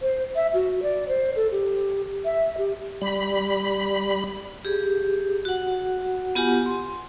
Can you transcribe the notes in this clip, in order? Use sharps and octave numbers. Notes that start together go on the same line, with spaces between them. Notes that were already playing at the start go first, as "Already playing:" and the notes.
C5
E5
F#4
D5
C5
A4
G4
E5
G4
G3 B5
G4 G#4
F#4 F#5
B3 F4 G4 F#5 G#5
C6